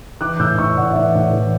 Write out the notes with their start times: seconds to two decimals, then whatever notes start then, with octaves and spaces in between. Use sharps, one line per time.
0.21 E3 D6 F#6
0.39 A2 E6 G6
0.58 A2 C#6 E6
0.77 A2 D5 F#5
0.92 E5
0.95 E3 D5 F#5
1.15 A2
1.33 E3